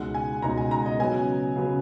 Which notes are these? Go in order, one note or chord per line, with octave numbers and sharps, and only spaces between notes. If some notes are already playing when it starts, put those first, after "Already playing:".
Already playing: C#2 B2 G#3 D#4 F#5
G#5
C#2 B2 G#3 D#4 A#5
G#5
A#5
D#5
C#3 F#3 B3 G#5
C#3 F#3 B3